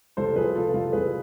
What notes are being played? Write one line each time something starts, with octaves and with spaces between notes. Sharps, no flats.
C2 A4 C5
F3 G#4 B4
C3 F4 A4
C2 F4 A4
C2 G#4 B4